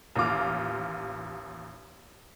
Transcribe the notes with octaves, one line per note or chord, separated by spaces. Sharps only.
A1 D#2 F4 D6 F6